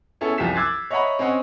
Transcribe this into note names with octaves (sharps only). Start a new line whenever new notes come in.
B3 C#4 E4 A4
C2 F#2 F3 G4 B6 E7
D6 E6 F#6 G#6 A6 C7
C#5 D#5 E5 F#5 A#5 B5
C4 C#4 D#5 F#5